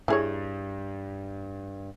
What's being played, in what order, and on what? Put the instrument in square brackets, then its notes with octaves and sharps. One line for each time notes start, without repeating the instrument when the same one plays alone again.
[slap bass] G2 [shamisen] E4 G#4 C#5